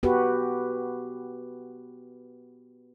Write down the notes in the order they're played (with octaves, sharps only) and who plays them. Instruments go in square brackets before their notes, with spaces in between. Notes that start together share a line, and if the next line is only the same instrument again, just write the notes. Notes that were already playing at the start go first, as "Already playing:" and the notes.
[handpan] B3 F#4 G4 B4